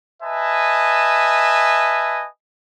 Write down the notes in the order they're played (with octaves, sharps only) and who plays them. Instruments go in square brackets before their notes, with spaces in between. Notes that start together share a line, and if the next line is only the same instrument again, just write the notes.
[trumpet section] B4 D#5 E5 G#5 A5